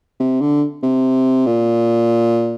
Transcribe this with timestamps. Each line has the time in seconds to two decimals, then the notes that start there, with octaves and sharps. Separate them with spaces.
0.20 C3
0.41 D3
0.83 C3
1.46 A#2